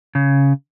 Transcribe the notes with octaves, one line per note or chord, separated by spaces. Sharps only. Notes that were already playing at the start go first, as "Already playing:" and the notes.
C#3